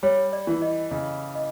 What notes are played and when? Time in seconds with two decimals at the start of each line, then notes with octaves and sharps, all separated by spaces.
0.03 G3 C#5
0.33 D5
0.47 E3
0.62 D#5
0.91 C#3 D#5
1.35 D#5